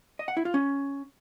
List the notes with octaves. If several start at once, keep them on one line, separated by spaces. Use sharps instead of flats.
D#5
F#5
E4
F4
C#4